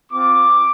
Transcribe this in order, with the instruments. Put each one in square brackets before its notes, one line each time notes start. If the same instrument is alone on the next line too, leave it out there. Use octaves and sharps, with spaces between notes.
[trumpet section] C4 F4 D6